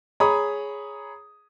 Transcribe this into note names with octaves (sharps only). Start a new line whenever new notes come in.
G#4 C#5 A#5 B5 D#6